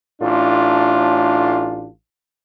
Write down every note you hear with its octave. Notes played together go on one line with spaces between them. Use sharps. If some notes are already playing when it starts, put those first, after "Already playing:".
A1 A2 D4 F4